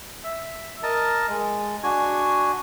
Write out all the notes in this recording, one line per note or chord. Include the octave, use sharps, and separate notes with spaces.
E5
A#4 D#5 A5
G#3
D4 F#4 G#5